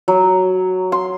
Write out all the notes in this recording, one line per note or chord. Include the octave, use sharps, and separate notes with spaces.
F#3
C6